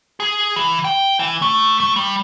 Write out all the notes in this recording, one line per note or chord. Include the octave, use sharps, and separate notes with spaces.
G#4
E3
G5
E3
A3
A3
G3